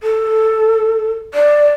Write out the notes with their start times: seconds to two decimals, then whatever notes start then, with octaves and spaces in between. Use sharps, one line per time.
0.03 A4
1.34 D5